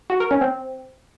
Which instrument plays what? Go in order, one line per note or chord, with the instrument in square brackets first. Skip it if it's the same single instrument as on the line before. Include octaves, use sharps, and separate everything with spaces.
[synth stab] F#4
A#4
C#4
C4